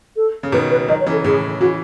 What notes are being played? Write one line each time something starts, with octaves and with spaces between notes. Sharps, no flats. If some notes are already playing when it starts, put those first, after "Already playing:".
A4
C#3
B2 D#3 B4
B4
D#3 F#3 D#5
C#5
C#3 E3
A4
A2 C#3 G#4
C#3 E3 F#4